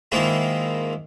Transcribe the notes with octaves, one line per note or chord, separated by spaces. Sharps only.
G#2 D#3 A#3 E4 F4